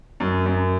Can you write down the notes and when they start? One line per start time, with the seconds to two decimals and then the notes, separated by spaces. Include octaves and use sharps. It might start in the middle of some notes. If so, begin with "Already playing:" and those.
0.20 F#2
0.46 F#2